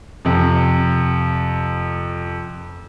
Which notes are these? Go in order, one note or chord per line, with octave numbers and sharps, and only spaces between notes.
F2 C3